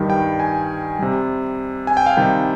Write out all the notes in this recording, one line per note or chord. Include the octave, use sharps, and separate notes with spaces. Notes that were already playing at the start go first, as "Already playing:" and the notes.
Already playing: G2 D#3 G3
G5
G#5
C3 G3
G#5
G5
F5
C3 D#3 G3 G5